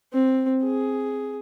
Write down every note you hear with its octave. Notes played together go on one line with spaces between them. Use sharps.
C4
G#4